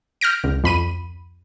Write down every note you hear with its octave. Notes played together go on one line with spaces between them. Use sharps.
F6 G6 A#6 D7
C#2
F2 B5 D#7